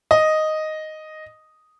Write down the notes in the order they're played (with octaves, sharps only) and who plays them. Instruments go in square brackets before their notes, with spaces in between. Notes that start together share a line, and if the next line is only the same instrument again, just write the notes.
[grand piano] D#5